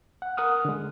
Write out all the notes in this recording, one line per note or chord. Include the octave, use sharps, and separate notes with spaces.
F#5
A#4 F#5 D#6 F6
D3 G#3